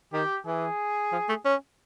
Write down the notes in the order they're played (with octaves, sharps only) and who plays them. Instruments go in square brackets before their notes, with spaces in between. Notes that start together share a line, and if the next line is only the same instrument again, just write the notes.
[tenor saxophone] D#3 [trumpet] G4
[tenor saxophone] E3 [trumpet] G#4
[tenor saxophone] F3
A3
C#4